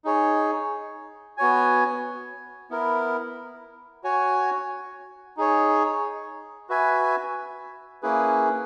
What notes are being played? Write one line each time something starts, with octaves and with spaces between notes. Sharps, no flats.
D#4 G#4 C#5
B3 F#4 C#5 G#5
B3 E4 A#4
F#4 C#5 G#5
D#4 G#4 C#5
F#4 B4 E5 G#5
A#3 C#4 E4 G#4 B4